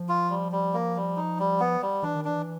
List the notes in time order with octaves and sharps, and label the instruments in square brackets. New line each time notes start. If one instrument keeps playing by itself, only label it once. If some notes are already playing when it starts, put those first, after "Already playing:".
Already playing: [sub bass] F3
[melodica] F4
G3
G3
A#3
G3
D#4
G3
B3
G3
[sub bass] E3 [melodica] D4
[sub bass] D#3
[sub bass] E3 [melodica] D4